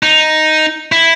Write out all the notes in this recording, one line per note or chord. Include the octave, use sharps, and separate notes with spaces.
D#4
E4